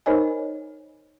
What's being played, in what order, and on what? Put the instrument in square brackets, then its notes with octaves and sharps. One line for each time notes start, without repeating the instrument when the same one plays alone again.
[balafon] D#4 A#4 C5 C#5 D#5 G#5